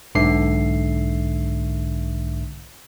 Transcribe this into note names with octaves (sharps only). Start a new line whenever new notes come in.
B1 G#2 D3 E5 C7